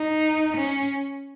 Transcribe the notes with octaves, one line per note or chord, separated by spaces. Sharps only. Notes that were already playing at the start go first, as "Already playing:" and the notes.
Already playing: D#4
C#4